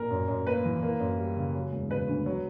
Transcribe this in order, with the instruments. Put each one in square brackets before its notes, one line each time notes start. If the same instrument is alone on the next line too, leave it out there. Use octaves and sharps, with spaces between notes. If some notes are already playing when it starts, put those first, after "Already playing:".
Already playing: [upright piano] A#2 A#4
F#2
F#2
A#3 B4
E3
A#3
F#2
G3
C#3
F#3
E1
C#3 B4
D2
F#3